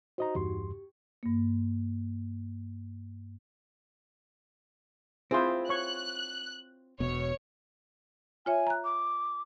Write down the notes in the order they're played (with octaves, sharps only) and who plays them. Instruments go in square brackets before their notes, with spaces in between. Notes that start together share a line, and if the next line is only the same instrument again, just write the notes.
[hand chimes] D#4 F#4 [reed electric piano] C5 D#5 A#5
[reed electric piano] E2 G2 C6 [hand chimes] G4
[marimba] G2 A#3
[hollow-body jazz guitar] C4 F4 [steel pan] E4 G#4 C5
[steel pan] C#5 C#6 [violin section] F#6
[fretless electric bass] E1 B2 [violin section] C#5 C#7
[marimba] F4 C#5 E5 [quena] G#5
[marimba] A#5 F#6
[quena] D6